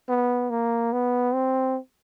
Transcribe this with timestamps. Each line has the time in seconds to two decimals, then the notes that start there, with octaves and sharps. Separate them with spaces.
0.09 B3
0.50 A#3
0.93 B3
1.34 C4